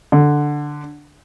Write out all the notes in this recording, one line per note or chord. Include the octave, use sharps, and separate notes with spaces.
D3